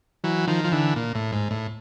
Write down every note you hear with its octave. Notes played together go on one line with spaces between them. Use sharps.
E3 F#3
D#3 F3
F3
D3 E3
A#2
A2
G#2
A2